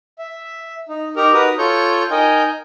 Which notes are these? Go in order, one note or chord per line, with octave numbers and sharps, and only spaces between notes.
E5
D#4
D#4 G4 A#4 A#5
D#4 F#4 A#4 B4 A#5 D#6
F4 A4 C#5 C#6 G6
D#4 A#4 D#5 G5 G#5